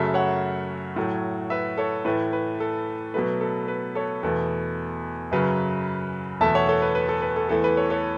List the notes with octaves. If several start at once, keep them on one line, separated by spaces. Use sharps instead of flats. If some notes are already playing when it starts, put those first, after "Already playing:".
Already playing: F#2 C#3 F#3 A3 E5 A5
C#5 F#5
A2 F#3 A3
B4 E5
A4 C#5
A2 E3 A3 B4
B4
A4
B2 F#3 A3 B4
A4
B4
A4 C#5
E2 B2 A3 A4
F#2 C#3 F#3 B4
E2 B2 A3 E5 A5
C#5 F#5
A4 C#5
B4
B4
A4
B4
A4
E2 E3 A3 A4
B4
A4 C#5
A4 C#5